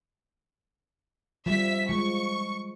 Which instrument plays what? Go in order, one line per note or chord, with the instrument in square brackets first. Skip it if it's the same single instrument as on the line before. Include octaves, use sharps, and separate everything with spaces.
[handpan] F3 G3 [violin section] E5 B6
[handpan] F3 G#3 [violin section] C#6